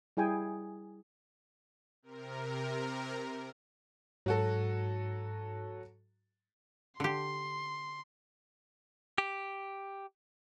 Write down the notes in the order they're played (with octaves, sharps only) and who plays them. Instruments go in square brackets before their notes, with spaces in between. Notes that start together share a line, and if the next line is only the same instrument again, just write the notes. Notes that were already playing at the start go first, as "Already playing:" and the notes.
[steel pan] G3 E4 G#4 G5 G#5
[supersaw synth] C3 A#4
[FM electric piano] G#2 [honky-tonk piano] F#3 F#4 A4
[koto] D3 G4 [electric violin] C6
[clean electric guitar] G4